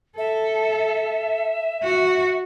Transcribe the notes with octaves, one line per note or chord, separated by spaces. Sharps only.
A4 E5
F#4